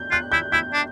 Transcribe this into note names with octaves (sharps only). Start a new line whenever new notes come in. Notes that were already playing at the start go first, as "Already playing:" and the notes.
Already playing: G6
F4 F#6
E4 G6
E4 G6
D4